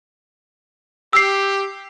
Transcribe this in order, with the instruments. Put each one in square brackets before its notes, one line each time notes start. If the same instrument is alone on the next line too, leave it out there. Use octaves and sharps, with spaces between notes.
[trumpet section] G4 [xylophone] E6 C7